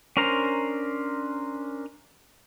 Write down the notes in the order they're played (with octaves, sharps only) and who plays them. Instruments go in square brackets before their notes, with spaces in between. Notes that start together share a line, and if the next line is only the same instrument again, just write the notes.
[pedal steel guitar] C#4 D4 A#4 C5 A#5